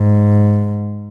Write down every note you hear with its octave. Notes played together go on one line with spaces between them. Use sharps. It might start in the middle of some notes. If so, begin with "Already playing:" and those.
Already playing: G#2